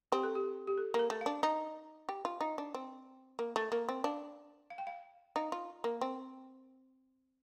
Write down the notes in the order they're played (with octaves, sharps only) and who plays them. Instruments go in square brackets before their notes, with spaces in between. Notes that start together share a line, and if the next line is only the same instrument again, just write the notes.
[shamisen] C4 [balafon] G4
[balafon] A4
G4
G4
A4
[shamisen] A#3
[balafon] A#4
[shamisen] A3
[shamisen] D4 [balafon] F5
[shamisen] D#4 [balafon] D#5
[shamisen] G4
F4
D#4
D4
C4
A#3
A3
A#3
C4
[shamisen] D4 [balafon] F5
[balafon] F5
G5
F5
[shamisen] D#4 [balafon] F5
[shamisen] F4
A#3
C4